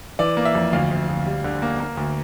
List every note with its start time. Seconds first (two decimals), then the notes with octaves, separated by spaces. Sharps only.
0.19 E3 D5
0.37 A#3
0.45 E5
0.55 F2
0.73 D2 F5
0.91 D2
1.09 D2
1.26 G3
1.44 D3
1.62 A#3
1.80 A#3
1.97 D2